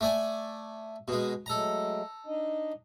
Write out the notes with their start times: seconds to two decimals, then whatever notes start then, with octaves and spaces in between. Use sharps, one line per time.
0.01 A3 D5 G#5
1.08 B2 G#3
1.46 F#3 G#3 A3 A4 A#5
2.26 D4 D#4 D#5